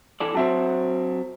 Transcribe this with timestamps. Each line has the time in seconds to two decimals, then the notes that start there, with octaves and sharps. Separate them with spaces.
0.20 E3 A4 D5
0.35 F#3 C4 F#4 C5 E5 A5